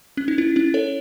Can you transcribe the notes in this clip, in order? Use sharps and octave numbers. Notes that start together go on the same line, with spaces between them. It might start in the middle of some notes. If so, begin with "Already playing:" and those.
C#4
D#4
C#4 E4
C#4 E4
A4 C#5